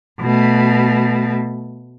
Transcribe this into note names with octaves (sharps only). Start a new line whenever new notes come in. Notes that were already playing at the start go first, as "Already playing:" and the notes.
B2 A3